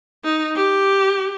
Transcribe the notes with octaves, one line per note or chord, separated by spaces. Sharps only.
D#4
G4